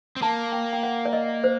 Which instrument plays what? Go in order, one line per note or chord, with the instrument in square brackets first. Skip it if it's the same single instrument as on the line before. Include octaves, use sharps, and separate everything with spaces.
[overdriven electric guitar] C4
[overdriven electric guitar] A#3 [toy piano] A5
[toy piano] G5
G5
F#5
D5
D#5
C5